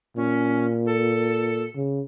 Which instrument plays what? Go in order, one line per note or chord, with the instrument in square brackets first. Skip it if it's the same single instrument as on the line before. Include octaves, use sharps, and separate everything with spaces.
[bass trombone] A#2 [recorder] C#4
[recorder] A4
[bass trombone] C#3